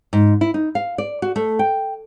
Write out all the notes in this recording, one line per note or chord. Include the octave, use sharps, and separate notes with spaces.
G#2
E4
D#4
F5
D5
F#4
A3
G5